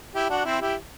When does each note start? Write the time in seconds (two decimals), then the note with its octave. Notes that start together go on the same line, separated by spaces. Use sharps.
0.15 E4 G4
0.30 D4 F#4
0.45 C4 E4
0.61 E4 G4